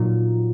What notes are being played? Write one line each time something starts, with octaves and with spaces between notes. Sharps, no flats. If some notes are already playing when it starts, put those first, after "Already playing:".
Already playing: A#2 F#3 D#4